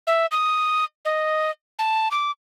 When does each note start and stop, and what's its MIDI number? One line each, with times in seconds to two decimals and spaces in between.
0.07 0.26 76
0.32 0.84 87
1.05 1.50 75
1.79 2.08 81
2.11 2.31 86